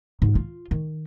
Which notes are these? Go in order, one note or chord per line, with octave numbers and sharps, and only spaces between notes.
G#2
F4
D#3